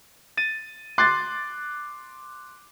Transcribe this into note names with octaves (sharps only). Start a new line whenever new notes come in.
A6 D#7
C6 D6 F#6 A6 C7